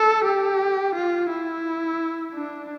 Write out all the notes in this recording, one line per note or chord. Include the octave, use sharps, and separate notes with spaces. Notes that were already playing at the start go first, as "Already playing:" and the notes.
Already playing: A4
G4
F4
E4
D4